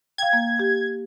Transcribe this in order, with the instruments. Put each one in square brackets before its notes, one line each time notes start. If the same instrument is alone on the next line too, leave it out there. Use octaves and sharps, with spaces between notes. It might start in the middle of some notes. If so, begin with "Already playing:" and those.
[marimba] F5 G5 [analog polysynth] G#6
[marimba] A#3
G4